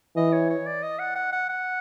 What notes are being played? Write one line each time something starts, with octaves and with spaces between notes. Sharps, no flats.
E3 D#5
C#5
C#5
D5
D#5
F#5
F#5
F#5
F#5